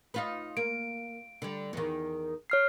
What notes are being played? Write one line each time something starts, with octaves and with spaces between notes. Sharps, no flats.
D#4 F4 B4
A#3 D7
D3 G3
E2 D#3
C#5 F6 C7